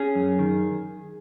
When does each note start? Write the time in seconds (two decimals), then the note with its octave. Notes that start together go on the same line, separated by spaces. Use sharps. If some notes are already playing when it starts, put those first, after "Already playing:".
Already playing: C#4 G#4
0.15 F#2
0.39 D#3